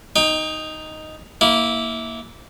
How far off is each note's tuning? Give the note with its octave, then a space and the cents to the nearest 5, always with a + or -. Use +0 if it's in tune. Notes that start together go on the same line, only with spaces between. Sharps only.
D#4 +0 G5 +30
A#3 +0 E4 -20